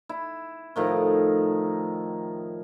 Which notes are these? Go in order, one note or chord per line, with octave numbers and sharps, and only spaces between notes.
E4
A2 D#3 F3